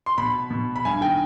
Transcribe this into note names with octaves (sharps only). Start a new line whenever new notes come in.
C6
B2 B5
B2
B5
G2 G#5
D#3 G5